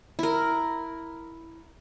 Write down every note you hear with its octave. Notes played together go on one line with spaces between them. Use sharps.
E4 A#4